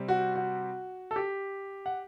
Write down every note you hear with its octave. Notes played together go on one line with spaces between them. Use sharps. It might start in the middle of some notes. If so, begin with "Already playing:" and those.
Already playing: C3 G3 C4
F#4
F#4
A4
G4
F#5